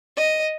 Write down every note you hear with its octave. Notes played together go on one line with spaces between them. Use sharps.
D#5